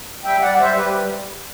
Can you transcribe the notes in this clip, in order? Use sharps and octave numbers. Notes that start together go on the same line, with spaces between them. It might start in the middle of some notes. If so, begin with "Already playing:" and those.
G3 E5 G5
G3 D5 F#5
G3 C5 E5
G3 G4 B4